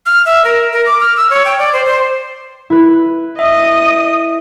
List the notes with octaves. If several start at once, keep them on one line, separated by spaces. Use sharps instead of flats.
F6
E5
A#4
A#4
D6
F6
E6
C#5
G5
D5
C5
C5
E4 B4
D#5 E5 D#6